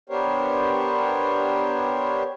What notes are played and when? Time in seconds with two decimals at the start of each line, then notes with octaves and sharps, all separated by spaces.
0.09 B3 D4 G4 A#4 C5 C#5